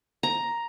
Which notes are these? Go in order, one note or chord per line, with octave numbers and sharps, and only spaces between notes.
A#5